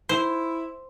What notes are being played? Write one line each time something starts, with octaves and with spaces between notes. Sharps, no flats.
E4 C5